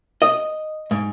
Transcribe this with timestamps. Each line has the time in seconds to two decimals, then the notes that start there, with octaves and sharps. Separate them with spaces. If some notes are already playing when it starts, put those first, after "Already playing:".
0.22 D#5
0.91 G#2